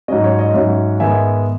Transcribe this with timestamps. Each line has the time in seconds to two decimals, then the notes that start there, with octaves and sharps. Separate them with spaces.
0.08 G#2 F#3 C#4 D#5
0.24 C#5
0.39 D#5
0.54 G#2 F#3 C#4 C#5 E5
1.00 G#2 D#3 G#3 B3 E5 G#5